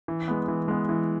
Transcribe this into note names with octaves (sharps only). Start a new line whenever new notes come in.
E3
G#3 B3
E3
G#3 B3
E3